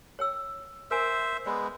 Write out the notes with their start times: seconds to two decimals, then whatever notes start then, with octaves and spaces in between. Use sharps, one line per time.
0.19 C#5 G5 E6
0.91 A#4 C5 E5 G#5
1.46 G#3 B3 D5